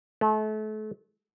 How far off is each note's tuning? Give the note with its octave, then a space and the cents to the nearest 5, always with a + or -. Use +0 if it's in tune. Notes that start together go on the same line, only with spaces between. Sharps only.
A3 -35